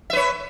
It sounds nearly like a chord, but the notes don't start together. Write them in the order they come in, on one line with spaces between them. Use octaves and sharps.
E5 B4 C#5